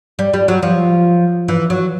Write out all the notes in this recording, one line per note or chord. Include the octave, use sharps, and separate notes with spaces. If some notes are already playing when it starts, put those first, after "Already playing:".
G3
G3
F#3
F3
E3
F#3